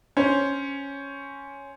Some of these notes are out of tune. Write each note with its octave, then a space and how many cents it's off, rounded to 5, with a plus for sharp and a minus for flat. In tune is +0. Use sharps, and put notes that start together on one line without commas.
C#4 +0 C5 +0